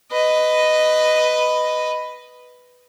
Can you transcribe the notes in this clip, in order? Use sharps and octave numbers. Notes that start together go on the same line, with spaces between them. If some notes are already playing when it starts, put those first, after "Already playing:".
B4 D#5